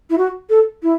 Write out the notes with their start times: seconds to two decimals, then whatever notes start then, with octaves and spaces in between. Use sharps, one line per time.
0.10 E4
0.18 F#4
0.50 A4
0.83 E4